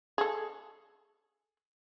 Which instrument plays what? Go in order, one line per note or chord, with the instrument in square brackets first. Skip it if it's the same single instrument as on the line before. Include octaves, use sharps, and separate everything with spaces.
[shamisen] G#4 A4